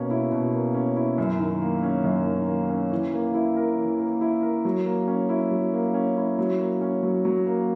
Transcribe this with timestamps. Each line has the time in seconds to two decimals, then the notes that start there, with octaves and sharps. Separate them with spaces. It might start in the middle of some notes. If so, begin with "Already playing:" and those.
Already playing: B2 A#3 C#4
0.10 E4
0.32 B2
0.53 A#3
0.74 C#4
0.96 E4
1.18 F#2
1.39 D#3
1.62 A#3
1.83 C#4
2.04 F#2
2.27 D#3
2.48 A#3
2.70 C#4
2.91 E3
3.14 A#3
3.34 E4
3.57 A#4
3.78 E3
3.99 A#3
4.21 E4
4.42 A#4
4.65 F#3
4.86 A#3
5.08 C#4
5.29 E4
5.51 F#3
5.74 A#3
5.94 C#4
6.17 E4
6.39 F#3
6.60 A#3
6.81 C#4
7.03 F#3
7.25 F#3
7.47 A#3